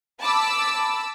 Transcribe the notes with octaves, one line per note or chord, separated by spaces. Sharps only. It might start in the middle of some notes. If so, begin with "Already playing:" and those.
A5 B5 D6 E6